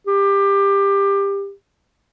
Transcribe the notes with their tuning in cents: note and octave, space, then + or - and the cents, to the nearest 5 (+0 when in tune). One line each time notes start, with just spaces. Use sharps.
G4 +20